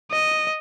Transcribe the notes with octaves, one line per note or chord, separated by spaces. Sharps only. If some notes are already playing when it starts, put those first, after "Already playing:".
D#5